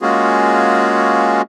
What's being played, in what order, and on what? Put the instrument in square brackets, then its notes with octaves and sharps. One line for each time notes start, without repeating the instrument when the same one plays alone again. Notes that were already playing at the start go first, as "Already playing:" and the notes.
[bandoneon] G#3 A#3 C#4 F4 F#4 G#4